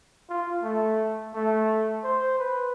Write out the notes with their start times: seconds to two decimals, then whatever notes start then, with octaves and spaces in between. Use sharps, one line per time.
0.29 F4
0.63 A3
1.35 A3
2.04 C5
2.39 B4